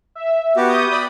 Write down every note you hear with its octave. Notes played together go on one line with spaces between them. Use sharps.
E5
B3 F#4 G4
D#6 G6
D5 B5